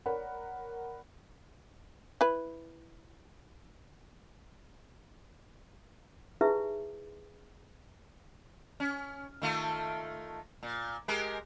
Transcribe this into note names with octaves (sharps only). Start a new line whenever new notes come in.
A#4 C#5 D5 F#5 B5
E4 B4
D#4 E4 G4 G#4 B4 E5
C#4
D#3 A3 F4
A#2
G#3 G4 A#4